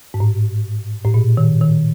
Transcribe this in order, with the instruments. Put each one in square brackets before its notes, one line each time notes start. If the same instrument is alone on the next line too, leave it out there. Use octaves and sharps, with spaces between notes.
[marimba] G#2
A2
A2
A#2
D#3
D#3